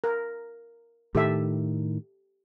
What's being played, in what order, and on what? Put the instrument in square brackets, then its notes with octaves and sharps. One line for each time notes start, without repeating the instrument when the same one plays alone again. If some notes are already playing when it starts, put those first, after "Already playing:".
[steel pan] A#4
[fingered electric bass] A2 D#3 [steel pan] G4 A4 E5